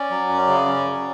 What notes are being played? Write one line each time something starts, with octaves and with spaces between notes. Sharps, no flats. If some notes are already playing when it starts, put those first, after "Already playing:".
Already playing: C#4 D5
F#3
F#2
C#3
C#4
F#3